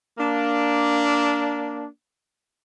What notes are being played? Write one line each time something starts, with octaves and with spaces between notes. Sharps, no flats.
A#3 D4